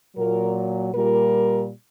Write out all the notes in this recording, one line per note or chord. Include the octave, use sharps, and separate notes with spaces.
A#2 F#3 A#4
A#2 G3 A#4